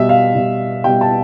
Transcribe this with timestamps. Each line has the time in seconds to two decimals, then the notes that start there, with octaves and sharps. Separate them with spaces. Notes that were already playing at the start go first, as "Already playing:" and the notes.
Already playing: B2 G3 E5
0.09 F5
0.35 B2 G3
0.84 B2 G3 G5
1.01 A5